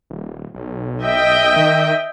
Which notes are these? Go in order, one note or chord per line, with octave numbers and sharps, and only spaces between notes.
D#1
B1
D#5 E5 G5
D#3